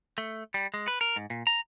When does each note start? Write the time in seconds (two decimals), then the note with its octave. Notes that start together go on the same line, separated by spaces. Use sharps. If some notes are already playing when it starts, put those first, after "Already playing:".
0.18 A3
0.54 G3
0.74 G#3
0.88 B4
1.01 A#4
1.16 G#2
1.30 A#2
1.47 A#5